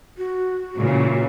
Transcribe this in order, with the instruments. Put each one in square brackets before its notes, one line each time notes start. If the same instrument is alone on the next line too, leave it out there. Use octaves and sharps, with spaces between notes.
[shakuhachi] F#4
[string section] A#2 C#3 E3